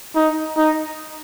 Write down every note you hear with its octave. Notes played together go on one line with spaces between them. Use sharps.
D#4
D#4